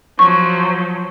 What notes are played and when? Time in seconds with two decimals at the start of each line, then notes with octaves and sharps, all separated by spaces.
0.19 F3 F#3 C#6